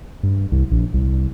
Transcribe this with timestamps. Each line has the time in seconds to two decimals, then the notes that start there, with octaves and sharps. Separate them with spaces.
0.23 G2
0.52 C2
0.72 A#1
0.94 C2